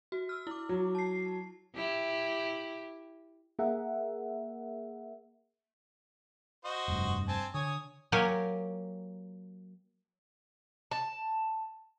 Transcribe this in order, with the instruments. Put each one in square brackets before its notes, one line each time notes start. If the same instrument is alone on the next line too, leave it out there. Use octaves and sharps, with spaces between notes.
[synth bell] F#4
E6 F6
E4 D6
[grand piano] F#3
[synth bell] A5 C7
[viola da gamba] E4 G4
[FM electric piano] A#3 G#4 A#4 E5 F#5
[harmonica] F#4 C5 D#5
[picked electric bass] F1 G2
[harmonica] C4 G#5 A5
[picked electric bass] D3 [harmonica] C#5 G#5 D#6
[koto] F#3 A#3 G4 A#4 C#5 G#5
[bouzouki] A5